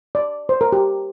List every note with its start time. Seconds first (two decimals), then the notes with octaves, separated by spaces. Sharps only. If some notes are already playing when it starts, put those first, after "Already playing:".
0.15 D5
0.49 C5
0.61 A#4
0.72 G4